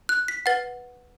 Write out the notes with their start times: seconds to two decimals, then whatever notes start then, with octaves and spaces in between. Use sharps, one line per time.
0.09 F#6
0.28 B6
0.46 B4 F#5 A6